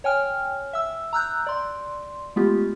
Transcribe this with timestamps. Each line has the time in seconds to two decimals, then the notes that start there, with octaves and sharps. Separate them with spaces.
0.04 C#5 G5 G#5 F6
0.73 E5 E6
1.13 A#5 E6 F#6 G6
1.46 D5 C6
2.36 G#3 A3 B3 F4 G4